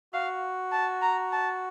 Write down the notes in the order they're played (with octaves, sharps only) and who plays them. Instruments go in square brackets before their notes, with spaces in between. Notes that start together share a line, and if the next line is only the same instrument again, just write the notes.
[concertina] F#4 [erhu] F5
[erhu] A5
A#5
A5